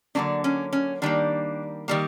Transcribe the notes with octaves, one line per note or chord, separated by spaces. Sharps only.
D3 F#3 A#3 C#4 D4
C#4
C#4
D#3 G3 A#3 D4
D#3 G3 A#3